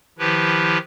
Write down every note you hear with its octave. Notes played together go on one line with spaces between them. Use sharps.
D#3 F3 E4 G4 B4